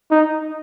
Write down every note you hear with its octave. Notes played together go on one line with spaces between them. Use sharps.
D#4